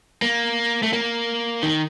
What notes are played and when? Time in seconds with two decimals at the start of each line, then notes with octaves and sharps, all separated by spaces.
0.22 A#3
0.83 A3
0.93 A#3
1.63 D#3